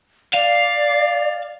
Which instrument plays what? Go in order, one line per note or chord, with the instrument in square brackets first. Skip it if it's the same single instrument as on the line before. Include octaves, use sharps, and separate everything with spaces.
[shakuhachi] D5 [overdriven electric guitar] F5